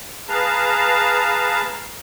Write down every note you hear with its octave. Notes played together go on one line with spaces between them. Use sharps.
G#4 B4 F5 A5 A#5